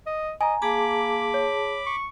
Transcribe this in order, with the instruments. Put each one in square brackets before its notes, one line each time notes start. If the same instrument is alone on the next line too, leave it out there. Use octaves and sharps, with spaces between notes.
[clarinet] D#5
[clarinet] D#5 [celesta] G#5 A#5
[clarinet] A#3 [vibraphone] G#4 A5 [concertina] B5 D6
[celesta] C#5
[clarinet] C#6